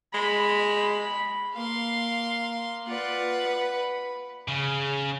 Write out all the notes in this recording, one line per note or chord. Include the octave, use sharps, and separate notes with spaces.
G#3 B5
A#3 F5 C6
F4 B4 D5 F#5
B5
C#3